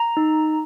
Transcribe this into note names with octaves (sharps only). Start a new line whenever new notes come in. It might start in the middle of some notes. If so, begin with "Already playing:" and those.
Already playing: A#5
D#4